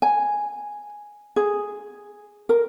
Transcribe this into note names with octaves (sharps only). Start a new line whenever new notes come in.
G#5
G#4
A#4